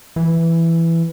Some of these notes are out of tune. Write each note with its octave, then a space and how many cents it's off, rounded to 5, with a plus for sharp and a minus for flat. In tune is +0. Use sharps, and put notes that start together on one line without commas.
E3 +10